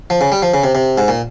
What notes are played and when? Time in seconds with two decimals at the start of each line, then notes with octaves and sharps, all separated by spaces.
0.10 F3
0.21 C#3
0.32 G3
0.42 F3
0.54 C#3
0.64 C3
0.75 C3
0.98 G#2
1.08 A#2